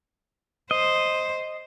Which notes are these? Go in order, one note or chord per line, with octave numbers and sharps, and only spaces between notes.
C5 D#5